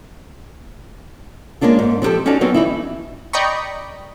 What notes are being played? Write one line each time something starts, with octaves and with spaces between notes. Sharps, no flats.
G#3 A#3 C#4 D4 F4
G#2
F3 C4 D4 G4 A4
C#4 D#4 F#4 D5 A5
F#3 B3 C4 D#4
E3 D#4 E4
D5 D#5 G5 A#5 B5 C#6